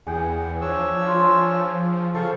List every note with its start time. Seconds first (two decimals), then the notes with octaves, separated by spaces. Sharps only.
0.07 E2 G#4 F#5 G5
0.61 F3 D4 C#5 E6
1.07 F4
2.14 C#3 F4 A4 C5 C#6